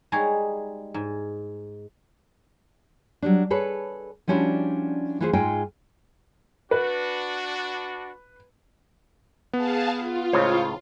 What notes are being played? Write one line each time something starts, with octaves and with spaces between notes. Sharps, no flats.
G3 G#3 D#4 G#4 C#5
G#2
F#3 G3 D4
G#4 A4 B4 C#5
F3 G3 C#4 D4 E4 F#4
E3 A3 E4 F4 G#4 C5
G#2 D#4 F4 G#4 G5 G#5
D4 F#4 B4
B3 G#4 F5 A5
F4
C#2 A2 C#3 C5 C#5